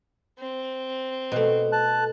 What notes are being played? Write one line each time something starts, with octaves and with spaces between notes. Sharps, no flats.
C4
B2 A3
A5 F#6